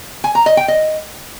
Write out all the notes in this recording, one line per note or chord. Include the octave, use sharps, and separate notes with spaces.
G#5
A#5
D#5
G5
D#5